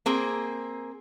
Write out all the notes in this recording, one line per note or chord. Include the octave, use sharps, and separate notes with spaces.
A#3 C4 G#4